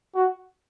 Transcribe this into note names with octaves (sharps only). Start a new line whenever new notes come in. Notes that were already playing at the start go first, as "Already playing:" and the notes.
F#4